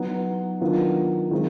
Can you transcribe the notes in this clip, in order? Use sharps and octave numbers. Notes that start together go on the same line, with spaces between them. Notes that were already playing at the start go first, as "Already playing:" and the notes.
Already playing: F#3 B3 D#4
D#3 F#3 B3 D4 F4
D#3 G#3 C4 F4